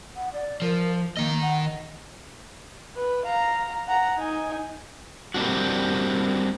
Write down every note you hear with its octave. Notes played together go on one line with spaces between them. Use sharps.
F#5
D5
F3 A#4
D#3 A#3 D#5
F#5
B4
F5 A#5
F#5 A#5
D#4 G#5
G3 A#3 C4 D4 F#4